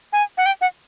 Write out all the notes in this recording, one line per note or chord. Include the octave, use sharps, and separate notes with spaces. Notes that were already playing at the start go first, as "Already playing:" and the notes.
G#5
F#5
G5
F#5